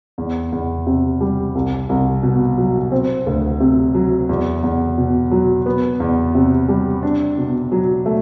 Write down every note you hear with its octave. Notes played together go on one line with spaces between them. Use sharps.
E2
E2
C3
G3
C2
C2
B2
F#3
C4
D2
C3
F#3
E2
E2
B2
F#3
B3
E2
C3
G3
D4
B2
F#3
A3